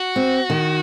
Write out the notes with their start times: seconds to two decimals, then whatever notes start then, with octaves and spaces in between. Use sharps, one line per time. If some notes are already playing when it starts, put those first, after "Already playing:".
Already playing: F#4
0.16 C4
0.50 D#3